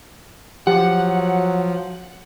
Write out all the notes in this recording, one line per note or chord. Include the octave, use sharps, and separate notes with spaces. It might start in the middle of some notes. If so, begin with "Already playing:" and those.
F3 F#3 G4 F#5